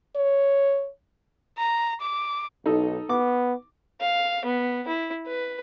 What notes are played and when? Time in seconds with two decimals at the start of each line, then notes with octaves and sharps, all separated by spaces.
0.16 C#5
1.58 A#5
2.01 D6
2.66 B1 D#4 A4
3.09 B3 D6
4.01 F5
4.45 B3
4.88 E4
5.27 B4